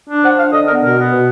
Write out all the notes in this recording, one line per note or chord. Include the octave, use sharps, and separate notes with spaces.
D4
F3 F#5
D4 F5
D3 D#5
B3 A#4
B2 A#4
B3
B2